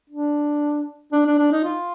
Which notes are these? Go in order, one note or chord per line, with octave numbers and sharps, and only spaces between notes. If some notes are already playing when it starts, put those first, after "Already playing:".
D4
D4
D4
D4
D#4
F4